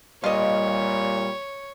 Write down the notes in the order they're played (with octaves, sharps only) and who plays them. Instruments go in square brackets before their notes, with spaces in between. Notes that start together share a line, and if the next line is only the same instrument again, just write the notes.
[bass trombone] A#2 [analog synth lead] G3 [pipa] F4 D#5 [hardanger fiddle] C#5